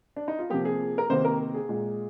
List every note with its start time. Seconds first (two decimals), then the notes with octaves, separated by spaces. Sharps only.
0.16 D4
0.28 D#4
0.39 F4
0.50 C3 F3 A#3 G4
0.65 G#4
0.98 A#4
1.10 C3 D#3 A#3 C5
1.25 A#4
1.54 G#4
1.69 A#2 G#3